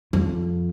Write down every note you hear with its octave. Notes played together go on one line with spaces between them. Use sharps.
F2